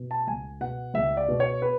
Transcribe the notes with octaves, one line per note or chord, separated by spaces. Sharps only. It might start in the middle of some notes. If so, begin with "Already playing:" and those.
Already playing: B2
A5
C#2 G#5
B2 F#5
C#2 E5
D5
B2
C#5
B4